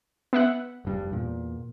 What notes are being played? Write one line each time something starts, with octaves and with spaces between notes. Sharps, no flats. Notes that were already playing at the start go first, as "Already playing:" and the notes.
B3 E5 F#5
F1 G2 G3
E2 A#2